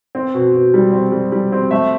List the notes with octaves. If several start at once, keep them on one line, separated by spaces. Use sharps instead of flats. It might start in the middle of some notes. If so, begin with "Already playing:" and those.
C4
B2
B2
G3
C4
G3
G3
C4
A3 E5